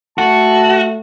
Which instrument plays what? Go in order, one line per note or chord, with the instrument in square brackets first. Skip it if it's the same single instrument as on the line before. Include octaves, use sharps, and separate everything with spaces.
[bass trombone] A3 [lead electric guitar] F#4 [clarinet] A5